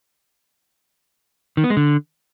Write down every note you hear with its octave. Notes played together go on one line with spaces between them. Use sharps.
D#3
B3
G#3
D3